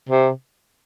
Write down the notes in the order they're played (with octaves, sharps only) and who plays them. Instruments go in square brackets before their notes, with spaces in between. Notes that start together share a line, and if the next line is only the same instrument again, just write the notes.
[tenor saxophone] C3